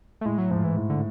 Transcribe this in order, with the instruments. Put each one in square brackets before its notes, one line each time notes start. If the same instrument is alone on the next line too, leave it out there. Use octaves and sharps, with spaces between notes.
[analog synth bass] A3
[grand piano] A2 [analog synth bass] G#3
[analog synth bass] F#3
[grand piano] G#2 [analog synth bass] F3
[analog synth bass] E3
[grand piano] A2
[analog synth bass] D3